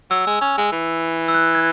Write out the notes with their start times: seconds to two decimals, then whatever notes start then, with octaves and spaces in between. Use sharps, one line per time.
0.11 F#3 E6
0.27 G#3
0.41 C#4
0.58 G#3
0.72 E3
1.28 E6
1.34 F#6
1.55 G#6